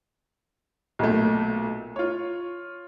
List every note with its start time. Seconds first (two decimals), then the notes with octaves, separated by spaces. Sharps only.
0.99 B1 A#2 A3
1.96 F4 C#5